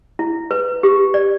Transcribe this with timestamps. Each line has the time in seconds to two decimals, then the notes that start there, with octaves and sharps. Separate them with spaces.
0.19 E4
0.51 B4
0.83 G4
1.14 D5